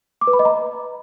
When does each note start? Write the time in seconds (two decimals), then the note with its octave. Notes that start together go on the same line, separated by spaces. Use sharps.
0.21 D6
0.27 B4
0.33 B5
0.39 D#5
0.45 A#5